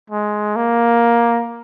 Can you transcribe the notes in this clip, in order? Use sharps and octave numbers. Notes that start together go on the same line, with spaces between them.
G#3
A#3